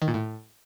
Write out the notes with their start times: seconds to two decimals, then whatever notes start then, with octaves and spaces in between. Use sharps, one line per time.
0.02 D#3
0.08 A#2
0.14 A2